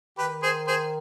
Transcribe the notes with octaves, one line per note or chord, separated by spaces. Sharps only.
D#3 G4 B4
G#4 C5
G#4 C5